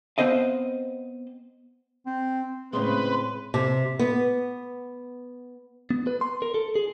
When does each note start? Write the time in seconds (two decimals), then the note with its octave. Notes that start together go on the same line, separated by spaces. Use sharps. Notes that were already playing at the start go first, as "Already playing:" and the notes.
0.18 B3 C4 C5 D#5 F5
2.06 C4
2.73 A2 C#3 G#3 C4 B4 C6
3.54 C3
3.99 B3
5.90 B3
6.07 B4
6.21 C6
6.42 A#4
6.54 A4
6.76 G#4